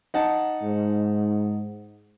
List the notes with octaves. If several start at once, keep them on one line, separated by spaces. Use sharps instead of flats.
D#4 F#5 A5
G#2